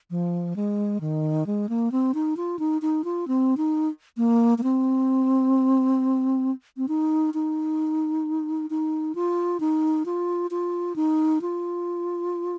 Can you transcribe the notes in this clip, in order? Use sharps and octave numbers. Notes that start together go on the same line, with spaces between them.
F3
G#3
D#3
G#3
A#3
C4
D#4
F4
D#4
D#4
F4
C4
D#4
A#3
A#3
C4
C4
D#4
D#4
D#4
F4
D#4
F4
F4
D#4
F4